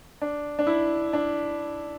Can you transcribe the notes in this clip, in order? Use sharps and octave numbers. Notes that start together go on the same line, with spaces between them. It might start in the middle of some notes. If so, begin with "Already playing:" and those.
D4
D4
E4
D4